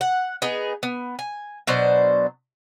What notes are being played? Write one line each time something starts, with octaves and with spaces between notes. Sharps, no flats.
F#5
B3 D#4 G#4
B3
G#5
B2 F#3 D4 C5